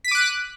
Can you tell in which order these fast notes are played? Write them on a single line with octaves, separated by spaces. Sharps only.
B6 D#7 D6 F#6